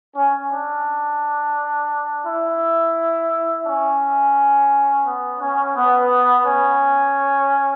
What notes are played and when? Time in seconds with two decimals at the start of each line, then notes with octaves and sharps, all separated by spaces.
0.16 C#4
0.51 D4
2.25 E4
3.65 C#4
5.04 B3
5.39 C#4
5.75 B3
6.44 C#4